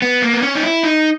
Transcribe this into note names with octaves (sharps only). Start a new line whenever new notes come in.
B3
A#3
B3
C#4
D#4
E4
D#4